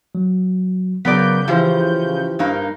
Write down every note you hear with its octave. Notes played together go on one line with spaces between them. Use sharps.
F#3
C#3 F#3 B3 A#4 D5 G6 B6
E3 F3 E4 G4 C5
G2 A#3 D#4